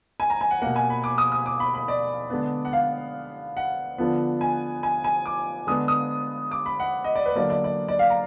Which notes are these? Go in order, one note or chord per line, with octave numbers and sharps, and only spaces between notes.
G#5
A#5
G#5
F#5
B2 A#3 F#5
G#5
B5
D6
D#6
D#6
D6
B5
B5
D5
D3 G#3 B3
F#5
F5
F#5
D3 F3 B3
G#5
G#5
G#5
D6
D3 G#3 B3 D#6
D#6
D6
B5
F#5
D#5
D5
B4
D3 F#3 A#3 D5
D5
D5
D5
F5
A#5